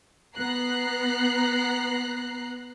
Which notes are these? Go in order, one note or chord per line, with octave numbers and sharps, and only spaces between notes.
B3 A#5 F#6 C7